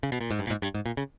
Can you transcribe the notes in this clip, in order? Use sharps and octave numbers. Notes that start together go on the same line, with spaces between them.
C#3
B2
A#2
G#2
G2
A#2
G#2
G2
G#2
A#2
C#3